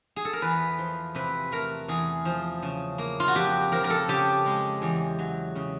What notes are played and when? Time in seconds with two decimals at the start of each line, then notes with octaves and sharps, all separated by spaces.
0.16 G#4
0.25 A4
0.33 A#4
0.42 E2 B4
0.79 F3
1.15 C3 B4
1.52 A3 A#4
1.88 E2 G#4
2.25 F3
2.63 C#3
2.98 A#3
3.20 F4
3.28 F#4
3.35 F2 G4
3.72 F3 A#4
3.84 A#4
3.90 A4
4.08 C#3 G4
4.46 G#3
4.82 E2
5.19 F#3
5.56 C#3